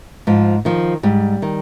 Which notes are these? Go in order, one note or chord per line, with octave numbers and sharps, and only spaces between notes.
G#2 F3
D#3 F3
G#2 G3
D#3